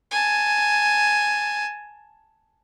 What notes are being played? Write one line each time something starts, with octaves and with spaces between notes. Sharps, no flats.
G#5 A5